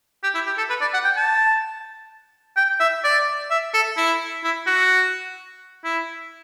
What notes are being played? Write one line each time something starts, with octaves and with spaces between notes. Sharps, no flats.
G4
E4
G4
A4
B4
D5
F#5
G5
A5
G5
E5
D5
E5
A4
E4
E4
F#4
E4